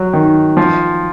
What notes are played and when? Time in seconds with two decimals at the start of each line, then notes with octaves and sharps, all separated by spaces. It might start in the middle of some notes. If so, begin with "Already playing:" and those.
Already playing: F#3
0.13 D#3
0.57 F3